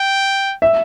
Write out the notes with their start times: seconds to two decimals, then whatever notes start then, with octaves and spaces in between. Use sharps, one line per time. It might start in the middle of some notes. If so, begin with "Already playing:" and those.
Already playing: G5
0.62 E5